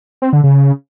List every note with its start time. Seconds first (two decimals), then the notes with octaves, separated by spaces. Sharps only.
0.22 C4
0.33 D3
0.44 C#3